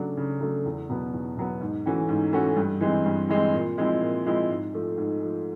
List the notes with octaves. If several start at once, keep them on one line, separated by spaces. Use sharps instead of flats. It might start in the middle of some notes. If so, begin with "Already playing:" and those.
Already playing: C#3 F#3 A3 D4
C#3
F#3 A3 D4
E2
B2 F#3 B3
E2
B2 F#3 B3
G#2
E3 A3 C#4 F#4
G#2
E3 A3 C#4 F#4
G2
E3 G#3 C4
G2
E3 G#3 C4
A#2
F3 G#3 C4 E4
A#2
F3 G#3 C4 E4
G#2
F3 A3
G#2
F3 A3